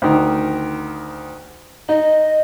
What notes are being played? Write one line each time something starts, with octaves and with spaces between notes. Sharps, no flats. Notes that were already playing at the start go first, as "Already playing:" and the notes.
D2 D#3
D#4 D#5